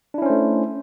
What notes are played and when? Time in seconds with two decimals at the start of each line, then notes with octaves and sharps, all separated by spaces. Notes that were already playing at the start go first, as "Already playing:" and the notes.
0.14 D4
0.18 E4
0.22 C#4
0.26 C5
0.30 A3